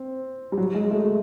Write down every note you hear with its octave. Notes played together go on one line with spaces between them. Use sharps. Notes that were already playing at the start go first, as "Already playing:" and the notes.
Already playing: C4
G3
F#3
G#3
A3